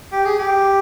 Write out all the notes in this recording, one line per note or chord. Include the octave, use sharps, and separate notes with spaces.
G4
G#4
G4